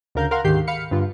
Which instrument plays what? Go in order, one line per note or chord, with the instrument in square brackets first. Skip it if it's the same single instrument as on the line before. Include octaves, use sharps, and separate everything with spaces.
[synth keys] D2 C#3 A#4 F5 G6
A#4 F5 F#5 C6
D2 G#2 D#3 G4 G6 C7
F5 B5 C#7
G2 D3 F4